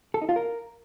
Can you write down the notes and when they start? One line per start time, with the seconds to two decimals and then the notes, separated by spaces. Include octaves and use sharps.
0.14 A4
0.22 D#4
0.29 F4
0.36 A#4